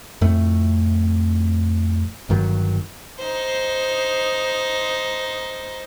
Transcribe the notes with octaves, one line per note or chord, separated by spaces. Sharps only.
F2 A2 A3
G1 G2 D#3 F#3
D#4 C5